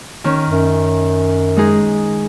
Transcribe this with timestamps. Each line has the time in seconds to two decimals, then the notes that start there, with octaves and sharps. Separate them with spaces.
0.24 D#3 C#4
0.49 F#2
1.57 G#3 D#4 G#4